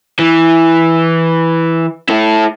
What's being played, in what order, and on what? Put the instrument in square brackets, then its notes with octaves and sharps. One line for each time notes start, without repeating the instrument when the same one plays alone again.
[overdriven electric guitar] E3
E4 A4